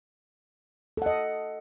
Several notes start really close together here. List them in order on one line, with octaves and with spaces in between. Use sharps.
A4 F#5 D#5